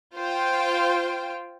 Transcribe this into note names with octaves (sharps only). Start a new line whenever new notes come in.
F4 C5 G5